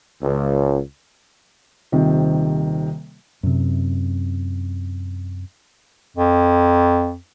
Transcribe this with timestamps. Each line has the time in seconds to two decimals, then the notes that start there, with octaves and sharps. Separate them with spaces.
0.23 C#2
1.92 D#1 C3 D#3
3.43 F#2 C3
6.17 F2